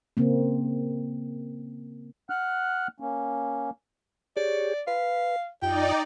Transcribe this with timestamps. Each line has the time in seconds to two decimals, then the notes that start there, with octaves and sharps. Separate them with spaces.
0.17 C#3 A#3 C4
2.30 F#5 F6 F#6
3.00 A#3 C#4
4.37 G4 G#4 C#5 D5
4.87 B4 F5
5.62 F#2 D#4 F4 D5 G5